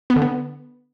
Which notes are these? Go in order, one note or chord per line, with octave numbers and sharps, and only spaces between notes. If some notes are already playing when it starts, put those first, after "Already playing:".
B3
D3
B3